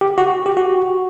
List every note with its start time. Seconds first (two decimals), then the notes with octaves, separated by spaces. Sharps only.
0.01 G4
0.18 F#4
0.46 G4
0.57 F#4